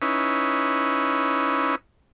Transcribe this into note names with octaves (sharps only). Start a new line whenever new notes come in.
C#4 D#4 E4 B4